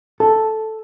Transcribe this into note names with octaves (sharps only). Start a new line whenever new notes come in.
A4